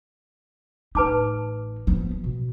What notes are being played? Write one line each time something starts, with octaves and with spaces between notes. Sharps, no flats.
A1 D#4 B4 A5 D6
F3 B3
B2